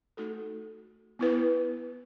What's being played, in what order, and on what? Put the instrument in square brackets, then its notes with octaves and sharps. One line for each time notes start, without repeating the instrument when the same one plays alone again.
[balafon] A3 D#4 F#4 A4
B3 E4 B4